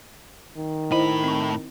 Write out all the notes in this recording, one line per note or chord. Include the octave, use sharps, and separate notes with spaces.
D#3
A2 E4 C5 D#5 B5
C4 C#6